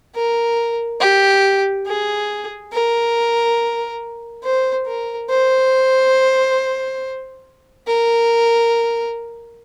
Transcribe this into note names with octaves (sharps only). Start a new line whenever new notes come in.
A#4
G4
G#4
A#4
C5
A#4
C5
A#4